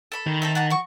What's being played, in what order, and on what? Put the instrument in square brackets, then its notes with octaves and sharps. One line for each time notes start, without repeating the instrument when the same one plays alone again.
[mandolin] A4 B5
[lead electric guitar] D#3
[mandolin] C4 A4 E5
F#5 A5 A#5
F#4 C#6